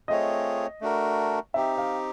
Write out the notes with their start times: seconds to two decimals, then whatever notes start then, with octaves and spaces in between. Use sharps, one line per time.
0.08 A3 C4 F4 G#4 C#5 D#5
0.81 A3 D4 F#4 A#4
1.54 C4 D#4 G4 E5
1.78 F5